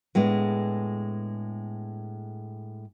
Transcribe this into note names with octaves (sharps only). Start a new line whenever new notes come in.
A2 G#3 B3 D4